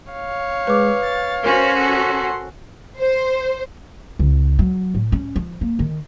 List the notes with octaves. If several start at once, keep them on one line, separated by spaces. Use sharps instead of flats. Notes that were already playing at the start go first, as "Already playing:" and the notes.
C#5 F5
G#3 B4 D6
A6
C#4 F#4 A#4 C5 C6
A4 F#5
C5
C#2
F#3
A2
C#4
F3
A#3
D#3